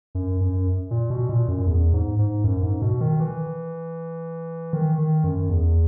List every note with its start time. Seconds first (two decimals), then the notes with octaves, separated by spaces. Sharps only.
0.15 F#2
0.41 F#2
0.91 A#2
1.10 B2
1.29 A#2
1.48 F#2
1.67 E2
1.93 G#2
2.19 G#2
2.44 F#2
2.63 G#2
2.82 B2
3.01 D#3
3.20 E3
4.73 D#3
4.98 D#3
5.24 F#2
5.50 E2